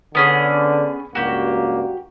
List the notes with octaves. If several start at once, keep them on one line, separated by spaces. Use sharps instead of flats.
D3 B3 C#4 G#4
C#2 G2 A#3 F#4 G4